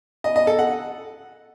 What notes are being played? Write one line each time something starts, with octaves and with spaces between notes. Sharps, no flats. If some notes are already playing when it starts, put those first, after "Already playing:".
D#5
D#5
A4
F#5